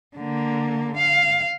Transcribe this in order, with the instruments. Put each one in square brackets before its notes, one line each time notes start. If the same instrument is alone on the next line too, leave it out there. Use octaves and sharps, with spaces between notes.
[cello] D3 A#3
F5